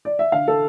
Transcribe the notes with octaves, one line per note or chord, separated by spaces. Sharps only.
D5
E5
D3 F5
A4